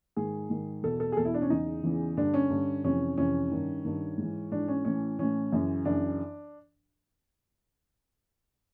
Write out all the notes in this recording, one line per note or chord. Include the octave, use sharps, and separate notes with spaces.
G#2 D#3 G#4
G#2 D#3
E2 B2 A4
A4
G#4
E2 B2 A4
E4
D4
C#4
E2 C#3 E3 D#4
E2 C#3 E3
G2 D3 D4
C#4
G2 D3
F2 C3 E3 C#4
F2 C3 E3 C#4
G2 D#3
G2 D#3
G#2 E3
G#2 E3 D4
C#4
A2 E3 C#4
A2 E3 C#4
F#2 C#3 E3
F#2 C#3 E3 D4